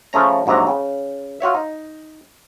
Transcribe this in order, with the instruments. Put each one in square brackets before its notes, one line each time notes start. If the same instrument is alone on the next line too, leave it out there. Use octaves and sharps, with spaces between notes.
[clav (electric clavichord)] C#3 F3 A3 C#4 A#5
A#1 G#2 C3 F#3 A#5
C#3
F4 F#4 C#5 E5
D#4